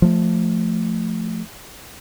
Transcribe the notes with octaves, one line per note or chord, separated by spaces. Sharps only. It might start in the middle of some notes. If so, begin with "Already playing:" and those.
F3 A3